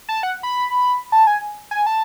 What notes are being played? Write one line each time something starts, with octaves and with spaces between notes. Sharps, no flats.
A5
F#5
B5
A5
G#5
G#5
A5